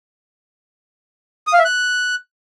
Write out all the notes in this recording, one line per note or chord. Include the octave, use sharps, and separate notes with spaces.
D#6
F5
E5
F#6